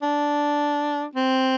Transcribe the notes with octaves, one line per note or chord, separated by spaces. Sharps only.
D4
C4